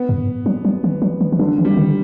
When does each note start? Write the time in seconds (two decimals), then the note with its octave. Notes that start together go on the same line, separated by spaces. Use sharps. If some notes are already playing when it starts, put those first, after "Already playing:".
Already playing: B3
0.09 G2
0.46 F#3
0.65 F#3
0.84 E3
1.02 F#3
1.21 E3
1.32 E3
1.39 D3 F#3
1.58 E3
1.65 G3
1.77 D3